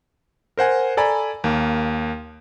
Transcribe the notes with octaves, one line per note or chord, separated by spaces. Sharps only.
A#4 C5 F#5 G#5
A4 D5 G#5 A#5 B5
D#2 A#3